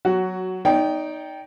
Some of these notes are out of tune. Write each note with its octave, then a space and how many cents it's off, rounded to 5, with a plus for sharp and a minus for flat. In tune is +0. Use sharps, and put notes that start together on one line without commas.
F#3 +0 F#4 +15
D#4 +0 D5 -35 G5 +0